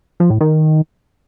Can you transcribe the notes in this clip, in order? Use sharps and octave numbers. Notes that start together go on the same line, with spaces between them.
F3
A2
D#3